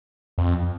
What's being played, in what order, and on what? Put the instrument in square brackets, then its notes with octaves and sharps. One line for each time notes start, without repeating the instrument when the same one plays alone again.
[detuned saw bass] F2